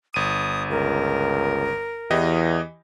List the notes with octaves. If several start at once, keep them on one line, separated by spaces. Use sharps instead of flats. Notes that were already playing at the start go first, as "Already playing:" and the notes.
G1 D#6 D#7
C#2 A#4
E2 E3 G4 D#5